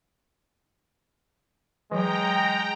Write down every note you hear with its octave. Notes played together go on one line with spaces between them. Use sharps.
E3 F#3 G#3 G5 A#5